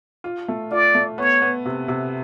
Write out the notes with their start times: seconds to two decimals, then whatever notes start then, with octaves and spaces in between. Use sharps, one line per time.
0.24 F4
0.48 A3
0.71 F4 D5
0.95 A3
1.18 B3 C#5
1.42 B3
1.65 C3
1.88 C3